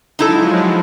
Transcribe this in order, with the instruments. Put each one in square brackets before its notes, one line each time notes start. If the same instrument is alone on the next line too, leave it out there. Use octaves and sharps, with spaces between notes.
[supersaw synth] F3 F#3 G#3 [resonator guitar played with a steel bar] D#4 E4 A4